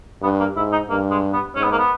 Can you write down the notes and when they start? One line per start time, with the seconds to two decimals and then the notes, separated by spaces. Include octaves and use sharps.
0.22 G2 B3
0.40 A#3
0.56 G#2 E4
0.72 D#4
0.89 G2 A#3
1.11 G#3
1.33 B3
1.55 G#2 C#4
1.64 B3
1.71 A#3
1.78 B3